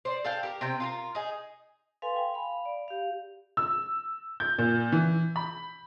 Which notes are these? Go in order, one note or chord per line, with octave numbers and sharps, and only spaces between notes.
C5 D5
A4 F5 G5
G4 A#4
C3 C4 G5
F4 A4 A#4
D#4 G#4
A4 B4 F5 G#5 C6
G5 G#5
F5 B5
D5
G4 F5
E6
G6
A#2
E3
B5